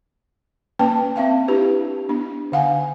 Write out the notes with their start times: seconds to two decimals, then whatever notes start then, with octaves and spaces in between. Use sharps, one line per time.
0.79 A#3 C#4 B4 G5 A5
1.16 C4 E5 F5 A5
1.48 D4 E4 G4 B4
2.09 B3 D4
2.52 D3 F5 F#5 G#5